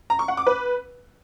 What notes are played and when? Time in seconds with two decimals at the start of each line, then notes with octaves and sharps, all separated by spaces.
0.10 A#5
0.19 C#6
0.28 F#5
0.37 D6
0.47 B4